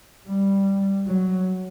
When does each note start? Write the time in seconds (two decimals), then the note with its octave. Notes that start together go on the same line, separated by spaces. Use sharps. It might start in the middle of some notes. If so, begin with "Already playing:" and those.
0.29 G3
1.07 F#3